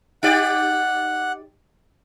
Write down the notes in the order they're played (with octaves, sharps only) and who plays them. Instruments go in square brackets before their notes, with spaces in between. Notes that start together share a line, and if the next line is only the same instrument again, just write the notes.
[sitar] D#4 G4 D5 [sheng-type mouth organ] F#5